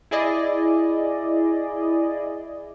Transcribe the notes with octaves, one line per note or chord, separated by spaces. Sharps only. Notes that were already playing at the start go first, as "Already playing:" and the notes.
E4 G#4 D5 D#5